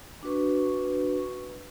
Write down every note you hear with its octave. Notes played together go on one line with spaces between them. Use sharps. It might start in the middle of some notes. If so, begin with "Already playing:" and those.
D4 F#4 B4 C#6